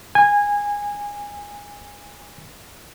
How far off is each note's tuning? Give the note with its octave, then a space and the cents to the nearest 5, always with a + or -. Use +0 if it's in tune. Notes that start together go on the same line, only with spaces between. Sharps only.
G#5 -20